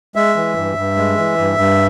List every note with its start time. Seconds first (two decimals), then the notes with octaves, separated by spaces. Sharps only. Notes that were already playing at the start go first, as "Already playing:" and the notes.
0.15 G#3 E5
0.36 E3
0.56 G2
0.77 G2
0.97 G#3
1.17 E3
1.38 G2
1.58 G2